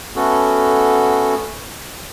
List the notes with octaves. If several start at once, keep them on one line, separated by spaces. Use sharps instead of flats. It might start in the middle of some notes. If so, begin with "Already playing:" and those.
A3 B3 C#4 F#4 A4